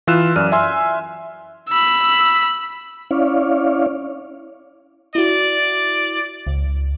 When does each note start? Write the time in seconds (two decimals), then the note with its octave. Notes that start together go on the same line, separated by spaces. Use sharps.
0.07 E3 F4 E6 F#6 E7
0.36 F#2 D5 F6 D#7
0.52 E5 G#5 C6 E6
1.69 B5 E6
3.11 C#4 E4 C#5 D5 F5
5.15 E4 F#4 D5
6.47 C#2